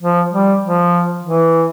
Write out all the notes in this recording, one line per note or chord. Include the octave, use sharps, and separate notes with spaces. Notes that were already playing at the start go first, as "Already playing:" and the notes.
F3
G3
F3
E3